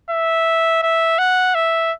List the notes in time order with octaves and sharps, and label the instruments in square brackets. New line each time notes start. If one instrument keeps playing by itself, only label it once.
[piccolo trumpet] E5
E5
F#5
E5